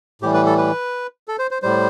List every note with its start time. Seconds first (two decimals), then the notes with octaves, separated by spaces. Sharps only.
0.22 A2 E3 G3 G4
0.34 B4
0.46 A4
0.58 B4
1.28 A4
1.39 C5
1.51 C5
1.62 A2 G3 C5